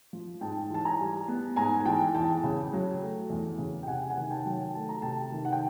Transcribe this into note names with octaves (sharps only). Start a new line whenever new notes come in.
F3
G#2 G5 A5
E3 A5
G#5 A#5
G3
B3
G#2 G#5 A#5
G#5
E3 G5 A5
E2 G5 A5
C#3
F#3
A3
E2
C#3
G5
C3 F#5 G#5
F#5 G#5
D#3
G5 A5
F#3
G5 A5
A3 A5
A#5
C3 G5 A5
D#3
F#5
G5